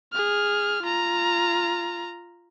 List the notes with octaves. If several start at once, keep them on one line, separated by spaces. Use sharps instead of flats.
G#4 F6
F4 A#5